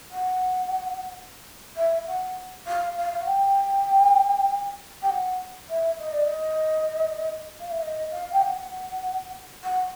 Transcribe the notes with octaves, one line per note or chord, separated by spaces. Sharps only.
F#5
E5
F#5
F5
F5
F5
F#5
G5
G5
F#5
E5
D#5
D5
D#5
F5
E5
D#5
F5
G5
F#5
F#5